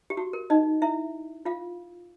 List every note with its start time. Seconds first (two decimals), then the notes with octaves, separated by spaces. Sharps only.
0.10 G4
0.17 F#4
0.33 A#4
0.50 D#4 D#5
0.82 E4 E5
1.45 F4 F5